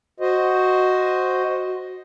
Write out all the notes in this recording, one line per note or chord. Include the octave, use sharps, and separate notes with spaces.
F#4 C5 D#5